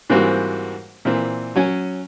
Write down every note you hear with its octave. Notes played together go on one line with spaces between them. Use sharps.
G#2 E3 G3 A#3 C4 F#4
A#2 E3 C4
F#3 C#4 G#5